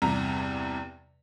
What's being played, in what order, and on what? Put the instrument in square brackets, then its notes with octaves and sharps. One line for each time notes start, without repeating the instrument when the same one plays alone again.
[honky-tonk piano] E2 G2 C3 A#5